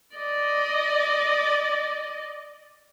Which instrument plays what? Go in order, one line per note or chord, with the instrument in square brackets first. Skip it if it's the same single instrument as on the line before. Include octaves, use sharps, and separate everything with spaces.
[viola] D5 D#5